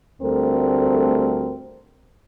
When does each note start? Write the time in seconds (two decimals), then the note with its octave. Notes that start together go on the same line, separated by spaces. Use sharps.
0.21 D2 G3 A3 C4 A4 A#4